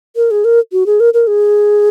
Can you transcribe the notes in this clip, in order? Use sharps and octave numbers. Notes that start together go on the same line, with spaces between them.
A#4
G#4
A#4
F#4
G#4
A#4
A#4
G#4